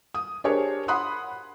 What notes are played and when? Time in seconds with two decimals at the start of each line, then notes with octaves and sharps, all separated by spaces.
0.14 D#6
0.44 D4 G4 G#4 A#4 C5 C#5
0.88 F#5 B5 C6 D#6 F#6